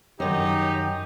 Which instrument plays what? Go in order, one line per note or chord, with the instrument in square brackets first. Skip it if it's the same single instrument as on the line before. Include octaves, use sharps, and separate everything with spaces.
[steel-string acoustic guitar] F#2 D#3 [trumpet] D#4 [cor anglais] G4